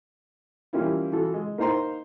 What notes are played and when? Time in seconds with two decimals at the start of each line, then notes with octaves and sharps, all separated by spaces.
0.73 E3 G3 A#3 C#4 E4 F4
1.12 E3 F4 F#4 A4
1.34 G#3
1.58 A#3 D#4 C5 A#5 C6